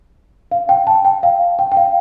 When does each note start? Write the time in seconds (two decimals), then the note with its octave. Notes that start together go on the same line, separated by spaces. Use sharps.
0.51 F5
0.69 G5
0.87 A5
1.05 G5
1.23 F5
1.59 G5
1.72 G5
1.77 F5